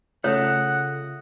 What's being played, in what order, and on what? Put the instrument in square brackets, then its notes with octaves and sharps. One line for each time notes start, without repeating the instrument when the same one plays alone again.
[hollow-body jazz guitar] C#3 A3 [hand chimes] F4 D#6 A#6 [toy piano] C#5 [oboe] F#5